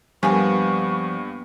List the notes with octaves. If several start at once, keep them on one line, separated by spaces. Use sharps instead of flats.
G2 F3 G3 A#3 B3 G#5 C#6